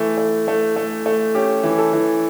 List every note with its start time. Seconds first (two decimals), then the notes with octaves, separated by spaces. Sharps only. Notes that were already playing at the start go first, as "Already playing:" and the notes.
Already playing: E3 A3
0.18 A3
0.48 A3
0.76 A3
1.06 A3
1.35 C#4 G4
1.64 E3
1.78 A4
1.93 E3